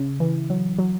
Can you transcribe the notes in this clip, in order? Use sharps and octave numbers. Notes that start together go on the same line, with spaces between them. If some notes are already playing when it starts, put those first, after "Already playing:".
Already playing: C#3
E3
F#3
F#3